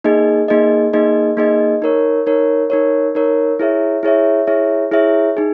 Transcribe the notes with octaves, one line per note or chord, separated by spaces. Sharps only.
A#3 D#4 G#4 D#5
A#3 D#4 G#4 D#5
A#3 D#4 G#4 D#5
A#3 D#4 G#4 D#5
D#4 A#4 C#5
D#4 A#4 C#5
D#4 A#4 C#5
D#4 A#4 C#5
E4 G#4 C#5 E5
E4 G#4 C#5 E5
E4 G#4 C#5 E5
E4 G#4 C#5 E5
D#4 G#4